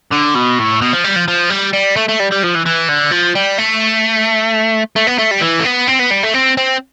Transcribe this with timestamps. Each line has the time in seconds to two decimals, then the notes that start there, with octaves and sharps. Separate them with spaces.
0.11 D3
0.35 B2
0.59 A2
0.81 B2
0.93 F3
1.04 G3
1.16 F3
1.28 F3
1.50 G3
1.73 G3
1.96 A3
2.08 A3
2.19 G3
2.31 G3
2.43 F3
2.54 E3
2.65 E3
2.89 D3
3.12 F3
3.35 G3
3.58 A3
4.96 A3
5.07 B3
5.19 A3
5.31 G3
5.42 E3
5.60 A3
5.66 B3
5.88 C4
6.00 B3
6.11 G3
6.24 A3
6.34 C4
6.57 C4